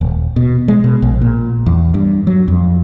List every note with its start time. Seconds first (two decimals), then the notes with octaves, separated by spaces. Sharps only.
0.01 D#1
0.36 B2
0.68 G#3
0.84 B2
1.02 A#1
1.21 A#2
1.66 E2
1.94 G2
2.27 F#3
2.48 F2